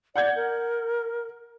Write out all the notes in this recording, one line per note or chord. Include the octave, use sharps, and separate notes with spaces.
D5 F#5 G6 G#6
A#4